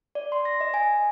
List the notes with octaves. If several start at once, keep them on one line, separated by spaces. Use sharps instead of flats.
D5
C6
A#6
D#5
G#5